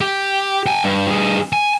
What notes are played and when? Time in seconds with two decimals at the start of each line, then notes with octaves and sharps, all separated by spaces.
0.01 G4
0.67 G5 G#5
0.84 G2
1.08 G2 G#4
1.53 G#5